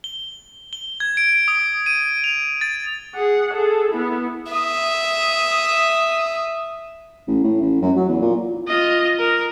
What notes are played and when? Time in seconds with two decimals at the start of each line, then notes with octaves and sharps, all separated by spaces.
0.04 G7
0.73 G7
1.00 G#6
1.17 D7
1.48 D#6
1.86 D#7
2.24 F7
2.61 A6
3.15 G#4 F#5
3.53 G#4 A4
3.92 B3 E4
4.53 E5 D#6
7.27 A1
7.44 A2
7.62 A1
7.82 F#2
7.96 F#3
8.08 E2
8.22 A#2
8.68 F4 D#5
9.19 A#4